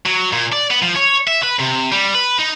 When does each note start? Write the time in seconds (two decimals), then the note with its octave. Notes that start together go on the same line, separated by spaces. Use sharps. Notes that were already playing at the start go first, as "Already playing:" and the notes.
0.06 F#3
0.33 A#2
0.52 D5
0.71 B3
0.83 F3
0.96 C#5
1.27 E5
1.42 B4
1.59 C3
1.92 G3
2.15 B4
2.39 D#4